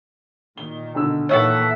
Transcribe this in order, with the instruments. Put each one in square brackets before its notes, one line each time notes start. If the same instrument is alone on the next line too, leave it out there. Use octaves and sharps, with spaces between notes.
[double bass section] A#2 D#3 [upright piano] G7
[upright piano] B1 D3 E6
[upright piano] D#2 C#5 [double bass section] A#2 E3 A#3 [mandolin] A4 E5 F#5